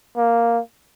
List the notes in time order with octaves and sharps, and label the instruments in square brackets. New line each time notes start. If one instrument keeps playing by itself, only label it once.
[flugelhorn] A#3